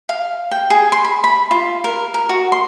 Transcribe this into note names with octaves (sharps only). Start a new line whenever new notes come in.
F5
G5
G#4
C6
B5
B5
F4
A#4
A#4
F#4
C6